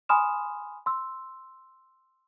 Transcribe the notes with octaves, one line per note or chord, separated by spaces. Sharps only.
G#5 B5 C6 D#6 F6 E7
C6 E6